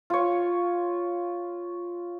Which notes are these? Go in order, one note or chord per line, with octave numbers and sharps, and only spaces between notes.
F4 C#5